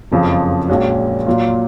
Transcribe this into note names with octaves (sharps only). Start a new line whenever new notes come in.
F#1 F2 C#3 F3
A#1 A#2 G#3 C#4 F#4
A#2 F#3 A#3 F4